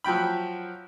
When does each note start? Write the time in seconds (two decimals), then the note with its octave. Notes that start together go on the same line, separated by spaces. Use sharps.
0.04 F3 F#3 G5 B5